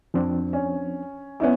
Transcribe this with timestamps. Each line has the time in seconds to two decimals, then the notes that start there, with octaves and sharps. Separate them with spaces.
0.14 F2 F3 C4 D4
0.53 C#4
1.40 B3 C#4 D#4 E4